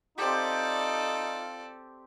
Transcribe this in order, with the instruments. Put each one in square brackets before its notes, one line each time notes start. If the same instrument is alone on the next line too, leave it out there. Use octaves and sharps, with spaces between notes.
[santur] C4 G4 [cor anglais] D#4 [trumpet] F4 [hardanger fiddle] A4 D5